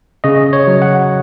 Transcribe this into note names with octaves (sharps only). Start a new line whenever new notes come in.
C#3 D#5
C#5
F#3
F#5